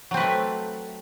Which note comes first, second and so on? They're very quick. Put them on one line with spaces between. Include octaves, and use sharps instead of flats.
F#3 C4 B4 A3